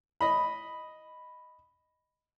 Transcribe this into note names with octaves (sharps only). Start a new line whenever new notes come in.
D#5 B5